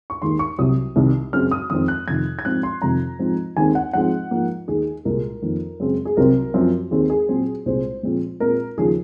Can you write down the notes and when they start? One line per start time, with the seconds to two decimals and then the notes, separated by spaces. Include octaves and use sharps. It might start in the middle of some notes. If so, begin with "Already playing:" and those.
0.10 C#6
0.21 D#2 D#3 G#3 C6
0.39 C#6
0.58 C2 C3 F#3 D#6
0.96 C2 C3 D#3
1.33 F#2 C#3 G#3 C4 F6
1.51 D#6
1.70 F2 D#3 G#3 C4 D#6
1.88 F#6
2.07 F2 C3 D#3 G#6
2.39 G#6
2.45 G#2 F3 C4 F#6
2.63 C6
2.82 F2 C3 D#3 A#5
3.19 G#2 F3 C4
3.56 D#2 D#3 G#3 C4 G#5
3.75 F#5
3.93 G#2 F3 G#3 C4 F#5
4.31 G#2 F3 A#3
4.68 D#2 D#3 A#3 G#4
5.05 C2 A#2 G#3 A#4
5.42 F2 D#3 A#3
5.80 F#2 C#3 G#3 C4
6.05 G#4
6.17 C2 C3 F#3 C4 A#4
6.54 F#2 F3 C4
6.91 D#2 D#3 G#3 C4 G#4
7.10 G#4
7.29 A#2 F#3 C4
7.66 C2 A#2 G#3 C4 C5
8.03 A#2 F3 G#3 C4
8.40 A#2 G#3 C4 A#4
8.77 D#2 C#3 F3 G#4